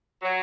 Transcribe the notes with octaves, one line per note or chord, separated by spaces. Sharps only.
F#3